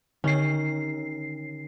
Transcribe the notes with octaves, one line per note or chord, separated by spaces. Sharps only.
D3 D#3 C#4 C7